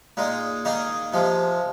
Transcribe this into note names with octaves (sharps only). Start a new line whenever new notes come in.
A#2 G#3 D#4
D#3 A#3 D#4 G#4
C3 F3 G#3